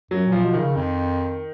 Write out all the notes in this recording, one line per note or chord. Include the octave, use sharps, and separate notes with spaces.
F#2 F#3
A#2
F3
B2
D#3
C#3
F2